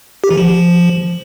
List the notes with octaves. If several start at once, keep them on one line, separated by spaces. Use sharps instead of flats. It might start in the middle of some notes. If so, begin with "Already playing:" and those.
G4
E3
F3